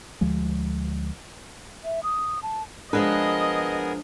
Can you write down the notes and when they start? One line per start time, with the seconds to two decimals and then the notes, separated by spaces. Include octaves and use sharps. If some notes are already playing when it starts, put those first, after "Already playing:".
0.21 D2 F3 G#3
1.84 E5
2.03 D#6
2.43 A5
2.93 F3 G#3 B3 D4 G#4 A#4 B4 D#5